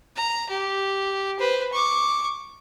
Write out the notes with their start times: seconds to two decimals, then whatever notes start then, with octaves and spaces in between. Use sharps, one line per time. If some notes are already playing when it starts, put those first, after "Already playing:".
0.16 A#5
0.49 G4
1.39 B4 C5
1.72 C#6 D6